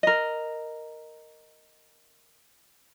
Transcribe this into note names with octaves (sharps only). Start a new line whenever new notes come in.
A#4 D#5